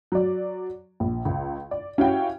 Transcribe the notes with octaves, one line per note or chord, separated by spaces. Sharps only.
F#3 D5
A#1
C#2
D5
C#4 E4 F#4 G4 F5 G5